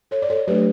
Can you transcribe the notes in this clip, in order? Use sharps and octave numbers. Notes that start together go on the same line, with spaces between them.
A4 C#5
D5
A4 C#5
F#3 A3 D4 G4 B4